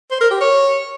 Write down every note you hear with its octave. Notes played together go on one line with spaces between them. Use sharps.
C5
A#4
G4
C#5